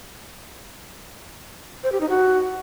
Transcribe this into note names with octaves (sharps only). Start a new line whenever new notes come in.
C5
G4
D#4
F#4